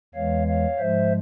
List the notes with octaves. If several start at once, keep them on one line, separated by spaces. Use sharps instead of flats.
E2 E3 G#3 C#5 F5
C#5 F5
G#2 F3 G#3 C5 E5